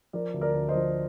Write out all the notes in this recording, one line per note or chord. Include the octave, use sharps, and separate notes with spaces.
F3 A#4 D5
D2
A#4 D5
D2
C5 D#5
F3